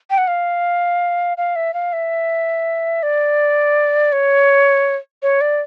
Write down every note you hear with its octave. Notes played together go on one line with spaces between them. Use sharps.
G5
F#5
F5
F5
E5
F5
E5
D5
C#5
C#5
D5